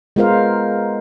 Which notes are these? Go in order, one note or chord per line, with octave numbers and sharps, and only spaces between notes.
G#3 B3 F4 A#4 C5 F5